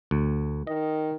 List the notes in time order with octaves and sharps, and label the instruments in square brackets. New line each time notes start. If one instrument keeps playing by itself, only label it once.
[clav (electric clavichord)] D2
[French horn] D#3 [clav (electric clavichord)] D#5